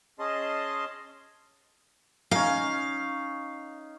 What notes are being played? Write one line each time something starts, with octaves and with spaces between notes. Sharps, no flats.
C#4 G#4 D#5 A5 C6
C#4 D#4 F5